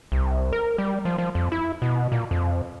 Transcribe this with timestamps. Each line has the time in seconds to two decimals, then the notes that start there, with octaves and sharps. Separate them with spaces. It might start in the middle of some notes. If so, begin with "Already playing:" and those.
0.12 C2
0.52 A#4
0.78 G3
1.05 F3
1.18 F3
1.35 F2
1.52 E4
1.82 B2
2.12 A#2
2.31 F2